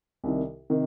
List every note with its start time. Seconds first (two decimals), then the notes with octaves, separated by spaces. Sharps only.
0.24 C2 C3 D#3
0.70 C3 D#3